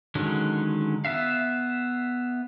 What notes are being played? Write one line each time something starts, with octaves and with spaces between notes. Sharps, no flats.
D3 D#3 F#3 G#3 C#4
B3 E5 F5